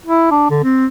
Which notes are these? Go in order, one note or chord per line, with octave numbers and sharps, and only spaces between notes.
E4
D4
D3
C4